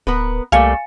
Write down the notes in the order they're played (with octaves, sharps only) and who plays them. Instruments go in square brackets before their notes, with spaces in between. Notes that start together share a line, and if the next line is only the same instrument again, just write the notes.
[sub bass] D1 [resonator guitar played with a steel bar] B3 A#4 B4
[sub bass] C2 [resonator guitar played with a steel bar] G3 A3 A#3 [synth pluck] F5 G#5 C#7